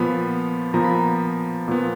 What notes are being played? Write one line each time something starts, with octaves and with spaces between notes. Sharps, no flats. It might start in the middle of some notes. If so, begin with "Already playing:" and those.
Already playing: A#2 F3 B3 B5
A#2 F3 B3 A#5
B5
A#5
A#2 F3 B3